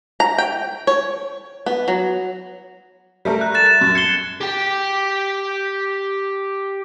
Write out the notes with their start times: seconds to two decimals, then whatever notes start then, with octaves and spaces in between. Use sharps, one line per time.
0.20 A#5
0.38 G5
0.87 C#5
1.66 B3
1.88 F#3
3.25 G3 A3 A#4
3.41 F#6
3.54 F#6 A6 E7
3.66 E7
3.81 F#2
3.95 G#6 C7 C#7 G7
4.41 G4 G5